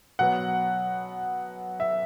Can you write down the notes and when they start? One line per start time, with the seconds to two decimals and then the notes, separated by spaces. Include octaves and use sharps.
0.19 B2 F#3 B3 F#5
1.80 E5